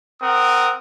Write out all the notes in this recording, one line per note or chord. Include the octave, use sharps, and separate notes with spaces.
C4 A#4 F#5 D#6